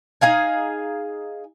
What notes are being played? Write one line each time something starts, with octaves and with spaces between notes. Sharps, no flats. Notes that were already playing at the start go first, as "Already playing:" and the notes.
D#4 G#4 F5 G#5